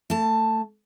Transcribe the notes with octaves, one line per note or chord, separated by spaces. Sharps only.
A3 A5